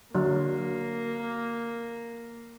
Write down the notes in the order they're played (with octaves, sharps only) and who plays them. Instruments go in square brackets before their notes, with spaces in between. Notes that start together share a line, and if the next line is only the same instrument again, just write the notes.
[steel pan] D3 F#3 [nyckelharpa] A#3